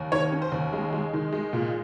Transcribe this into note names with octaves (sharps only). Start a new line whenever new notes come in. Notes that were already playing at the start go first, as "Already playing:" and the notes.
Already playing: D#2
D#3 C#5
C#4
C5
D#2
G#3
G#3
D#3
G#3
A#2